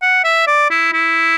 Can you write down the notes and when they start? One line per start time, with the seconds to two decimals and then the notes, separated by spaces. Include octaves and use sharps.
0.02 F#5
0.24 E5
0.47 D5
0.70 E4
0.93 E4